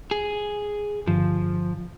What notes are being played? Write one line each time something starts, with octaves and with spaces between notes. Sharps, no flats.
G#4
G1 F3